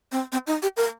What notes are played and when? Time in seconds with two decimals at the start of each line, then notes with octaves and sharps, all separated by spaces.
0.12 C4
0.32 C4
0.47 D#4
0.62 G4
0.77 A#4